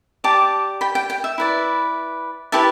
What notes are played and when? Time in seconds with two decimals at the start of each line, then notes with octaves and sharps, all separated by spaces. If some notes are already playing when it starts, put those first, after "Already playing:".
0.24 G4 D5 A5 D6
0.81 G5 B5
0.95 G5
1.10 G5
1.24 E5
1.38 E4 B4 D5
2.52 E4 G4 B4 E5 A5